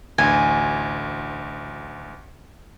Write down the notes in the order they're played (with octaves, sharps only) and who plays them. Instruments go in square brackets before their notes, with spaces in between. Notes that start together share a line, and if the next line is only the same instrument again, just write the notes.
[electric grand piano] A1 D2 [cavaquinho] G#5